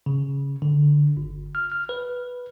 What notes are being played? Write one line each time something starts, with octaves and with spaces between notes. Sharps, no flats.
C#3
D3
G1
F6
F6
B4